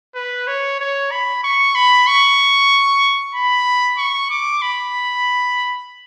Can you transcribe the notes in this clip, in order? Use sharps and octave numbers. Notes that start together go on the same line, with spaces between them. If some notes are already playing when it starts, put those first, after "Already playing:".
B4
C#5
C#5
B5
C#6
B5
C#6
B5
C#6
D6
B5